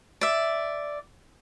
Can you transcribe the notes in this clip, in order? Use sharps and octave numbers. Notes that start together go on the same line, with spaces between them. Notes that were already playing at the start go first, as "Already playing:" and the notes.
D5 E5